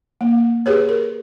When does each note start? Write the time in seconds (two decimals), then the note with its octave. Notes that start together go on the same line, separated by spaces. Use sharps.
0.21 A#3
0.66 G4 G#4 B4 C#5
0.89 A#4